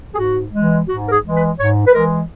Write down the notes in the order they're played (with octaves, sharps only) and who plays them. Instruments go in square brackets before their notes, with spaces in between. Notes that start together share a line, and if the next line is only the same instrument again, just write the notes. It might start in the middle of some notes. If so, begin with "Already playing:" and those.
[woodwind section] G#4
G#2 F#4
E3 G#3
G#2 F#4
A#4
G#4
E3 G#3
B4
G#2 C#5
B4
E3 G#3 A#4